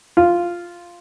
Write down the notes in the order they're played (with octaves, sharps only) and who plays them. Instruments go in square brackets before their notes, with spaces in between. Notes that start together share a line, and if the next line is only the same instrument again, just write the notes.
[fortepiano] F4